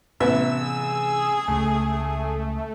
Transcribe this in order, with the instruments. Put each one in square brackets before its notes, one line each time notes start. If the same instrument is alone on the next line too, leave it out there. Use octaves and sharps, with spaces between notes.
[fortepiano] A1 B3 E5 [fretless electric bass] C3 E3 [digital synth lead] E6
[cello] G#4
[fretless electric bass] C#2 C#3 [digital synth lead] A3